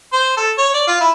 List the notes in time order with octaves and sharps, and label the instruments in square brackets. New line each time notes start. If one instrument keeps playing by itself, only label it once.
[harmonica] C5
A4
C#5
D5
F4
E4